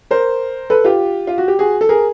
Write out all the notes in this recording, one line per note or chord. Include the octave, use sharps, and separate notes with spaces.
A#4 C5
A4 B4
F4 G4
F4
F#4
G4
F#4 G#4
A4
G#4 A#4